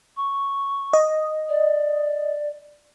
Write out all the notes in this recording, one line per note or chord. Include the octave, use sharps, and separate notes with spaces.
C#6
D#5
D5